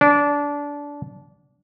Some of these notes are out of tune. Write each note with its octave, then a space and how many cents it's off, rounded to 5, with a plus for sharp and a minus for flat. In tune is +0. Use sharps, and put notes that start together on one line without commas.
D4 -20